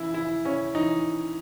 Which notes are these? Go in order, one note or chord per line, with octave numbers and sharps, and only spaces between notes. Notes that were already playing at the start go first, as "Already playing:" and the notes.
Already playing: C#3 E3 E4
C#3 E4
C#3 C#4
E3 D#4